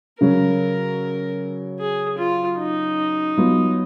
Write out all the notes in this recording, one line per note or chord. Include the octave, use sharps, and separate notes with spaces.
C#3 F#3 C#4 A#4
G#4
F4
D#4
F#3 B3 F4